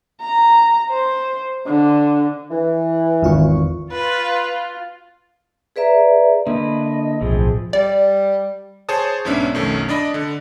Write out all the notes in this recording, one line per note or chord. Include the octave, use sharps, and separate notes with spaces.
A#5
C5
D3
E3
G#1 E2 F4 C#6
F4 B4
G#4 B4 D5 E5 A#5
D3 A#3 E4 B4 D#5
D1 B1 A2 E3 F3 C4 G#4
G3 D5
G#4 C5 C#5 A5 D#6
B1 G#2 B3 C#4 D4 E5
B1 F2 D#3 A3 C#4
D4 D5 D#5 B5
D3